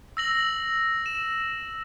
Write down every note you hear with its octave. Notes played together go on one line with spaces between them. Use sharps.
E6 A#6 F#7
E7